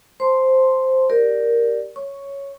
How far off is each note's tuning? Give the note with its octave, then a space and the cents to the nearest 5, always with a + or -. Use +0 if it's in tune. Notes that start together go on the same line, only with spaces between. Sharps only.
C5 +0 A5 +5 C6 +0
G4 +0 A#4 +0 D5 +0
C#5 +0 C#6 +0